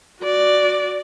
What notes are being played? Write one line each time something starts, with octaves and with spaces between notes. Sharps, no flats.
F#4 D5